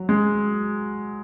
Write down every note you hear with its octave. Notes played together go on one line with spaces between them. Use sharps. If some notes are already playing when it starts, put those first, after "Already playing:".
Already playing: F#3
G#3